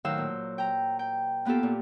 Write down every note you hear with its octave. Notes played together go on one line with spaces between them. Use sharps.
A2 D#3 F#3 C5 F5 E6
A#2
G5 A#5
G5
A#3 B3 F4 G4 A4
A#2